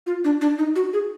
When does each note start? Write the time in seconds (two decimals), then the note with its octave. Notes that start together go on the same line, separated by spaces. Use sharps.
0.07 F4
0.24 D4
0.41 D4
0.58 D#4
0.76 F#4
0.93 G#4